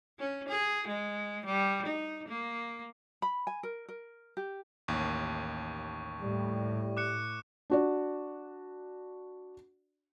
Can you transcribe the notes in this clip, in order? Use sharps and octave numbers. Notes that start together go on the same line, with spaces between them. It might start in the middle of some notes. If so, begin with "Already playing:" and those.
C#4
G#4
G#3
G3
D#4
A#3
B5
G#5
A#4
A#4
G4
A1 D#2 C#6
A2 G3
D6 F#6 C#7
D4 F#4 D5